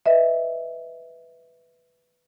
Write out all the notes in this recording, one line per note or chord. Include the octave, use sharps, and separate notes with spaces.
B4 D#5 E5